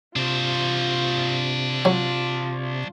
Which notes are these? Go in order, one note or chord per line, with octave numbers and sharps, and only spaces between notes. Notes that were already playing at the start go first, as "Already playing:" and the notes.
C3 D4 F4 C5
F#3 F4